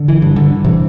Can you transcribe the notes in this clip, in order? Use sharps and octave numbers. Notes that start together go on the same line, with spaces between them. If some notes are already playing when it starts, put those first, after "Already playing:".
Already playing: D3
E3
G2
D3
C3 E3